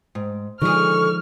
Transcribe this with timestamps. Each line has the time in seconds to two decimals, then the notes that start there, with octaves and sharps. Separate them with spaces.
0.15 G#2
0.62 D3 D#3 F3 G#3 G#4 C#6 F6